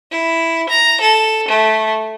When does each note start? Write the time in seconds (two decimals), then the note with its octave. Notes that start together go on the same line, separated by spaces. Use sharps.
0.11 E4
0.69 A#5
1.01 A4
1.48 A3